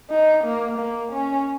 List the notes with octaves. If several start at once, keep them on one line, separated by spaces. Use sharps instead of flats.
D#4
A#3
A#3
C#4